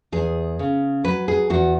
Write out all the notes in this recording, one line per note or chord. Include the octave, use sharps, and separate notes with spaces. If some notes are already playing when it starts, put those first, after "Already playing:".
E2 G#4
C#3
F#3 B4
G#4
E2 F#4